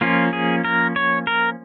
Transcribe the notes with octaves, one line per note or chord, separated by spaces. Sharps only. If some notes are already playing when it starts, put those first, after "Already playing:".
F3 A#3 C#4 F4
G#4
A#4
C#5
A#4